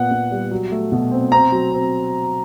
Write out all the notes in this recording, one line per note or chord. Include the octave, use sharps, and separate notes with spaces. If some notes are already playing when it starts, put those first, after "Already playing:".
Already playing: A#2 B3 F#5
B3
G3
F#3
A3
B2
C4
C4 A#5
F#3
C4